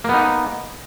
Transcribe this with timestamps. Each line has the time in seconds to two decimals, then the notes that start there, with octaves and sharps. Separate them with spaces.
0.04 A#3
0.09 B3
0.14 D#4